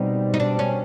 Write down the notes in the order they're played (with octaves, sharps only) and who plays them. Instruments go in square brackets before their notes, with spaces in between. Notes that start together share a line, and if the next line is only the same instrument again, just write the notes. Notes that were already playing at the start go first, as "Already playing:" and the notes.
Already playing: [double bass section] B2 G3 C4 [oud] D#4
[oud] D#4
D4
C#4